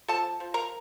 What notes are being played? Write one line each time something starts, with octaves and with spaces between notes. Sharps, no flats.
F3 A4 A5
F3
A#4 A#5